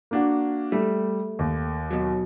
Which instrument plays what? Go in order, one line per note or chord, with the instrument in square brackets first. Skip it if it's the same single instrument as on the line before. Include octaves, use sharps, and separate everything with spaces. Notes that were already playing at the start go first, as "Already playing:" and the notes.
[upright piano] A#3 D4 F#4
[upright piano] G3 [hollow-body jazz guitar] A3
[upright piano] D#2
[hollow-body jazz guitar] B2 F#3